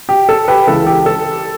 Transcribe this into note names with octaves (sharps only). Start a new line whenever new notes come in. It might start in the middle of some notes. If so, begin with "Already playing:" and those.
G4
A4
G4 B4
C#2 C#3 E3 A4
G4
A4